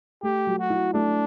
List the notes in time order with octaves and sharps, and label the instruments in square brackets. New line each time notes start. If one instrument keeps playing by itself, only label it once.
[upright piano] A3 [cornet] G4
[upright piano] F#3
[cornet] F#4
[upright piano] E4
[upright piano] A3 [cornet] D4